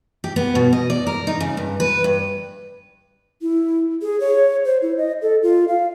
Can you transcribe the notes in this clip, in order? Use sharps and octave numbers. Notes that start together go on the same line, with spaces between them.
G4
B3
B2
D#5
D5
A#4
D#4
C#3
G2
B4
G2
E4
G#4
C#5
C5
E4
D#5
A4
F4
F5